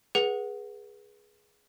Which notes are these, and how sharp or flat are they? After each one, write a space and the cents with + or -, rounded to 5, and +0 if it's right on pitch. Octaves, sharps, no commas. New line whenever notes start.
G#4 +0 B4 -30 F#5 +0